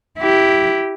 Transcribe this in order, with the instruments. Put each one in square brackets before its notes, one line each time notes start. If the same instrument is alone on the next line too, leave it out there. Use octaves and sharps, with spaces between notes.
[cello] E4 G4